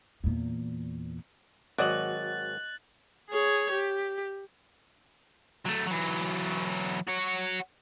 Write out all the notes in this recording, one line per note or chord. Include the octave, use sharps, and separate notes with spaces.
E2 A#2
G#1 F#3 D5 D#5 F#6 A6 F#7
G#4 C#5
G4
F#3 A3
E3 F#3
F#4 C#5